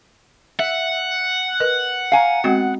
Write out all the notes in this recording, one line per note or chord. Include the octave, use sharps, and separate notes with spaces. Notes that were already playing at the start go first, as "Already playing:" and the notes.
E5 F#5
A#4 B4 D#5
F5 G#5 A#5
G#3 B3 C4 F#4